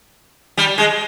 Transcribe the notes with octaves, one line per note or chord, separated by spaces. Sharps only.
G3
G#3